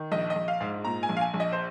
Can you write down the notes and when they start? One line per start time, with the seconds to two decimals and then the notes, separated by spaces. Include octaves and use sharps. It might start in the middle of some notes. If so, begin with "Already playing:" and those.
Already playing: D#3
0.12 A#1 D#5
0.30 D#5
0.36 A#1
0.48 F5
0.61 G#2
0.85 A#2 A#5
1.03 G#5
1.09 A#1
1.17 F5
1.21 G#5
1.34 A#1
1.40 D#5
1.52 C5